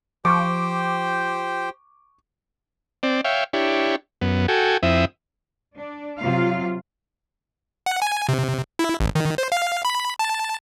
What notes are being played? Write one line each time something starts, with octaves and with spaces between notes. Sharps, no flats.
F3 G4 C5 G5 C#6 D6
C4 D5
C#5 E5 F5 G5
D4 E4 G4 C#5
F#2 B3
F#4 A4 G5 G#5
F2 C4 E4 E5 D#6
D4
C3 F#3 F4 F5
F#5
G#5
C3
E4
G#1
D#3
C5
F5
B5
A5